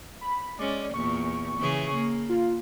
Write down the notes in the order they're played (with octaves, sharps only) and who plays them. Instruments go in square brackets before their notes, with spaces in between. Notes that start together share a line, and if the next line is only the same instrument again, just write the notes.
[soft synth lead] B5
[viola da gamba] G#3 C#4 [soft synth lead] D5
[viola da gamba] E2 A#2 [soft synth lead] C#6
[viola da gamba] C#3 E3 G#4
A#3
[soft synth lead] F4